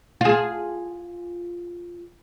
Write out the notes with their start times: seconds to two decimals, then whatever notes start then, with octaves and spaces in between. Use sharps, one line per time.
0.21 F4 G#4